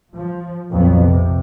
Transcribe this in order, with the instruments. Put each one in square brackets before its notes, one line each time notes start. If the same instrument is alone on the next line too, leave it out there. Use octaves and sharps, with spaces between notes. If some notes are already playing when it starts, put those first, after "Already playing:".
[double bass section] F3
A#1 F2 F#3 B3
C3